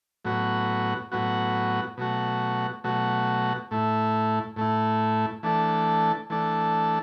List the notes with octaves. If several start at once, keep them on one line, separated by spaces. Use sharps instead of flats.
A2 F#3 B3 F#4
A2 F#3 B3 F#4
B2 F#3 A3 F#4
B2 F#3 A3 F#4
A2 A3 E4
A2 A3 E4
E3 A3 D4 A4
E3 A3 D4 A4